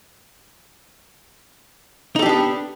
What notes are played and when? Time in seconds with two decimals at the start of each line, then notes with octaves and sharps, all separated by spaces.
2.16 D#4
2.19 A4
2.22 G4
2.26 D4
2.29 B3